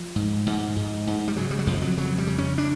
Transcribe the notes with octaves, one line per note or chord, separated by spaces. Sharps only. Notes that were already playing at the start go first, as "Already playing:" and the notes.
Already playing: F3
G#2
G#2
G#2
G#2
G3
C#3 F#3
G3
F#3
F2 F3
F#3
C#3 F#3
G3
C#3
C#4
D4